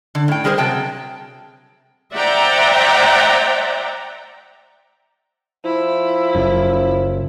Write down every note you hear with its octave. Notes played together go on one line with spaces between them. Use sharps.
D3
A2 G5
F#3 G3 G#4 A#4 C5
C3 F#3 G5 A5
C5 D5 E5 F#5 G5 A#5
F3 E4
F#1 F#2